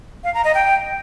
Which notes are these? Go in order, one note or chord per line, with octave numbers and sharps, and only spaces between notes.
F5
A#5
D#5
G5